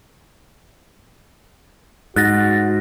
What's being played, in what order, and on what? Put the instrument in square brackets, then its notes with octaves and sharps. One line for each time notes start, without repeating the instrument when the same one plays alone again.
[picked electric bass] G#2 [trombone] F#4 [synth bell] F#6 A6 A#6